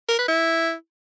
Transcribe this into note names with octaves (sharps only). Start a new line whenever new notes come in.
A#4
B4
E4